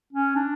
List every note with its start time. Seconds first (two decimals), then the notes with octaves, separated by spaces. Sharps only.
0.13 C#4
0.36 D4